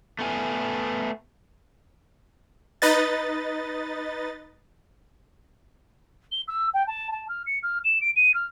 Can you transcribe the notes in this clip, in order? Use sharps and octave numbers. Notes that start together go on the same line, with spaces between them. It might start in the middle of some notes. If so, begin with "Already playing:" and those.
A3 B3 G#5
D#4 B4 D#5 A6
G7
E6
G5
A5
A5
F6
C#7
F6
E7
D7
D#7
F6